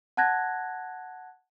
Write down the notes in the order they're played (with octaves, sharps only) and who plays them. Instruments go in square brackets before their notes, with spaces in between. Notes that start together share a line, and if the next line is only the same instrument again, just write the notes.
[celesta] F#5 A5 F#6 G#6 A#6